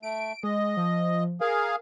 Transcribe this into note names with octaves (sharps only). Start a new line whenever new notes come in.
A3 D7
G#3 D#5
F3
G#4 A#4 F5